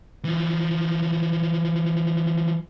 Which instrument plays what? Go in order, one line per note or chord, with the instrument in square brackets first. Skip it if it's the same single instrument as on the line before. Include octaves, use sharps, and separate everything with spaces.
[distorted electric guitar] E3 F3